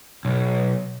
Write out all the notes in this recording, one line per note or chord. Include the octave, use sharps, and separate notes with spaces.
B1